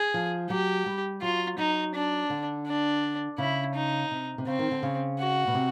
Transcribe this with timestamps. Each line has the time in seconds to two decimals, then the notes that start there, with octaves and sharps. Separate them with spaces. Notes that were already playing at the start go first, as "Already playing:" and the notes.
Already playing: G#4
0.14 F3
0.50 F#3 G4
0.86 G3
1.22 F#3 F4
1.58 F#3 D#4
1.94 D4
2.30 D3
2.67 D4
3.38 C#3 E4
3.75 D#4
4.11 C3
4.38 C3
4.47 C#3 C4
4.59 D#3
4.71 D3
4.83 C#3
5.19 F#4
5.47 B2
5.55 C3